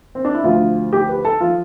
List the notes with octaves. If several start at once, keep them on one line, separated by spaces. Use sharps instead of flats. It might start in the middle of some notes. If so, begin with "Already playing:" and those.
C4
D4
E4
D2 D3 F3 F4
G4
B4
A4
F3 F4